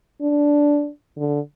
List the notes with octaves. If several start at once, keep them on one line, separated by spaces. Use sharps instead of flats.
D4
D3